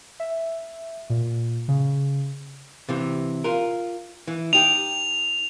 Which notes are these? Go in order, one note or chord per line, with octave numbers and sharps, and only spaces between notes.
E5
A#2
C#3
C3 E3
F4 A#4
E3
D#4 G4 F7